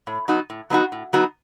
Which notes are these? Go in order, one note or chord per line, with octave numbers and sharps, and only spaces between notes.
A2
F#3 B3 D#4 F#4
A2
F#3 B3 D#4 F#4
A2
F#3 B3 D#4 F#4